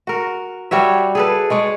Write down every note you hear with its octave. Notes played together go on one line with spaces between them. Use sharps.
F#4 A#4
G3 F#4 C#5 E5
G#4 A4 B4
G#3 C#5 D5